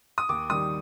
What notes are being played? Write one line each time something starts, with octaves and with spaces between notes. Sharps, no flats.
D#6
D#2 D6
D#3 G3 D#6